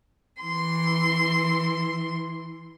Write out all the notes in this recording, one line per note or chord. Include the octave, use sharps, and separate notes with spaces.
E3 C6